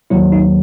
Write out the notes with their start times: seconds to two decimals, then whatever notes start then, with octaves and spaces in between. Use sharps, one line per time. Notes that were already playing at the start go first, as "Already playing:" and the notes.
0.10 D#2 D#3 F#3 E4
0.32 D#4